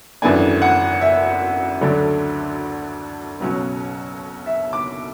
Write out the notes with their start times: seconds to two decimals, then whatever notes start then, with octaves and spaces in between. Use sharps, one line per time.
0.22 G#1 F#2 E3 A3 D4 G#5
0.62 F#5
1.01 E5
1.81 D2 D3 F#3 A3 D4
3.40 B1 B2 F#3 C#4
4.46 E5
4.73 D6